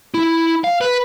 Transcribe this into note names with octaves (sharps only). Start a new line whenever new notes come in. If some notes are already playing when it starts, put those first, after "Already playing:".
E4
F5
B4